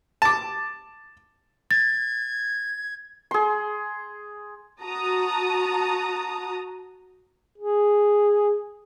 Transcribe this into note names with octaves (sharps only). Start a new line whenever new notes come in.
A5 D6
G#6 A6
G#4 C6
F#4 A5 A#5 D#6
G#4